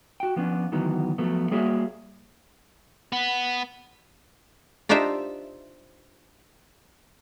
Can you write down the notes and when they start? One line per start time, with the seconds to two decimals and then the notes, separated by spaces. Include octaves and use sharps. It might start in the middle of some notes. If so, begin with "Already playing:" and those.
0.20 F#4 G5
0.36 F3 B3 C#4 D4
0.72 D2 D#3 E3 F#3 B3
1.18 F3 F#3 A3 B3
1.51 G3 A#3 F#4 G#4 C#5 E5
3.12 B3
4.89 D4 D#4 F4 G4 C5 E5